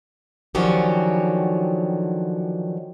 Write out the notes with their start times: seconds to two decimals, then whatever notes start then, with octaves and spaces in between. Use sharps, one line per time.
0.55 D3 D#3 F3 F#3 C#4 G4